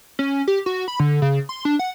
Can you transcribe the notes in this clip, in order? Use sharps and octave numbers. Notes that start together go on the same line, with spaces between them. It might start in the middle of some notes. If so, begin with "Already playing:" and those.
C#4
G4
F#4
B5
D3
C#3
C6
D4
F#5